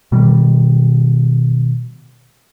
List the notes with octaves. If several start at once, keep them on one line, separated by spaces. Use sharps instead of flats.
B2 D#3 G3